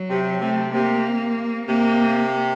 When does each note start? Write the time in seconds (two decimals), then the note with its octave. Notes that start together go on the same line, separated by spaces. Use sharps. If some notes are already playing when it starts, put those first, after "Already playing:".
Already playing: F#3
0.10 C3
0.41 C3 A3
0.72 C3 A#3
1.66 C3 A#3